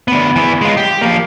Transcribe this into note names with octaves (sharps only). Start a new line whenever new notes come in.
D2 B3
E3 B3
G#3 F4
G4
F3 A#3